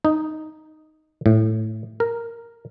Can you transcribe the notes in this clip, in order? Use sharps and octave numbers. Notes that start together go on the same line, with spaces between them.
D#4
A2
A#4